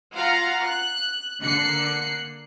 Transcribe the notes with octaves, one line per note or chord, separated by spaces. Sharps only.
F4 F5 F#5 A#5
F#6
D3 A#3 F#6 C7 C#7